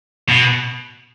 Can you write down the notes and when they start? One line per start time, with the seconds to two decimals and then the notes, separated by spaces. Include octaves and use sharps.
0.29 B2